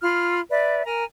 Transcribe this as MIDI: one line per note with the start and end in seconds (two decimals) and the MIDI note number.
0.02 0.39 65
0.02 0.39 83
0.02 0.39 89
0.49 0.84 71
0.49 0.84 74
0.49 0.84 76
0.85 1.04 70
0.85 1.04 80
0.85 1.04 82